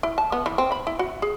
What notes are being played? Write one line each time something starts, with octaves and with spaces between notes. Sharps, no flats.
E4
A5
B3
E3
C4
B5
E4
F#4
G#4